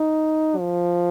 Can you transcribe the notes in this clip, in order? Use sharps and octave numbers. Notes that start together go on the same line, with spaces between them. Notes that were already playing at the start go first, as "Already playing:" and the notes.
Already playing: D#4
F3